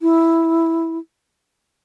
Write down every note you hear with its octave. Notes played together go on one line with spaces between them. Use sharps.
E4